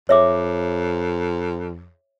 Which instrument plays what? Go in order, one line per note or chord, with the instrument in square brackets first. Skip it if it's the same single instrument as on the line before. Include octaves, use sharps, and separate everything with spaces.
[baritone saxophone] F2 [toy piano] C#5 E5 D6